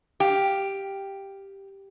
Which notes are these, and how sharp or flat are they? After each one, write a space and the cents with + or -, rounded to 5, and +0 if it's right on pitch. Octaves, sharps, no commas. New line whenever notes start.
G4 +0 F5 +0